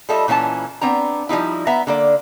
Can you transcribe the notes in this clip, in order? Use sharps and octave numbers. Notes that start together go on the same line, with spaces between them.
G3 F4 A4 D#5 E5
A#2 E3 C#4 F4 A5
B3 C4 D4 A#5
F3 G3 D#4 E4
B3 E5 A#5
D3 A#3 D5